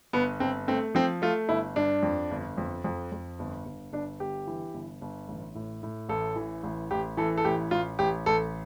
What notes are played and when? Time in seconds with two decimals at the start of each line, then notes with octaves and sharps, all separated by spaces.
0.13 G1 B3
0.40 G1 C4
0.68 A3 C4
0.95 F3 C4
1.22 A3 F4
1.49 G1 E4
1.76 G2 D4
2.03 F2
2.31 G1
2.58 F2
2.84 F2
3.12 F2
3.39 G1
3.65 G1
3.92 G1 D4
4.19 G1 G4
4.47 E3
4.74 G1
5.01 G1
5.28 A1
5.55 A2
5.83 A2
6.09 A1 A4
6.36 E3
6.63 A1
6.91 A1 G4
7.17 E3 A4
7.37 A4
7.45 A1 G4
7.71 A1 F4
7.99 A1 G4
8.26 A1 A4